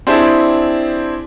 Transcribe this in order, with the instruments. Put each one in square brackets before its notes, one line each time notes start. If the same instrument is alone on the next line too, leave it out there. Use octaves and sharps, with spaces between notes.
[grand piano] C4 D4 E4 G4 G#4